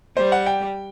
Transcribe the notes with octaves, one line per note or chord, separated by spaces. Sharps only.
G3 C5
F#5
G5